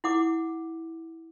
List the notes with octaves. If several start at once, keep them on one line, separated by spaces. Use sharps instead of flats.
E4 F#5 D6